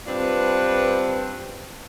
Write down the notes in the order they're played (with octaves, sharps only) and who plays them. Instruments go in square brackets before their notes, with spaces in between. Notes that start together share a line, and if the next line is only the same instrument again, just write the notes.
[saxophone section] G2 C4 D4 F4 B4